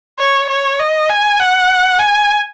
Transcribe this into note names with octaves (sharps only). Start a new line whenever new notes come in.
C#5
C#5
D#5
G#5
F#5
G#5